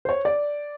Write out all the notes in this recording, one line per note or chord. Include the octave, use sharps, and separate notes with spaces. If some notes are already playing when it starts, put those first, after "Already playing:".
C5
C#5
D5